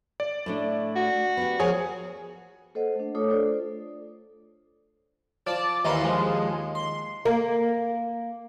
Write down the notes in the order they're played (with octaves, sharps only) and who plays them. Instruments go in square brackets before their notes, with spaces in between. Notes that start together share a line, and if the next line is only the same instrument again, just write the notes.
[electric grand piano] D5
[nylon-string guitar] A2 A3 D4
[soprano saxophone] F#4
[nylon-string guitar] B3 G4
[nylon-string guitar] F3 A#4 [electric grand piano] G#4 C#5 G#5
[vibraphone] A#3 A4 C5 D#5 F#5
A3 D4
A3 F4 A4 C#5 D6 D#6
D4 F4 A4 C5 D5
[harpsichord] F3 [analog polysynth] D5 A5
[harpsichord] D#2 A#3 D#4 [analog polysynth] E3 C6
[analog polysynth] F3 G#3
C6
[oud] A#3